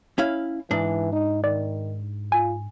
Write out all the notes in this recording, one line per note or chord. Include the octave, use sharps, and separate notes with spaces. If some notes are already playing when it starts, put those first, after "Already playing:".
C#4 E4 F5
G#2 E3 D4
D#4
D#3 D5
F4 G#5